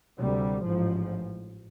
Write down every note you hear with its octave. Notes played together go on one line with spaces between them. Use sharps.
D2 C3 G3
A1 G#2 F3